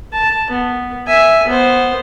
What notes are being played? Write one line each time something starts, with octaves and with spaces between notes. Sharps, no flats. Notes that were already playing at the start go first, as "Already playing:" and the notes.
A5
B3
E5 G#5
B3 C5